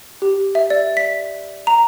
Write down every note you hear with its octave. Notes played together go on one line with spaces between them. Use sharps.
G4
E5
D5
B6
A#5